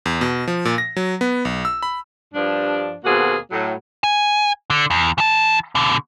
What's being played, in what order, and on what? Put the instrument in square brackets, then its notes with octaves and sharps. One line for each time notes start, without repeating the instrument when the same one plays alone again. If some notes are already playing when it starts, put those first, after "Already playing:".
[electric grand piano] E2
B2
F3
A#2
A#6
F#3
B3
B1
E6
B5
[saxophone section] G2 F3 D4
D#2 B2 A#3 C4 F#4 G#4
A2 F#3
[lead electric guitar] G#5
D3
E2
E3 A5
B2 D3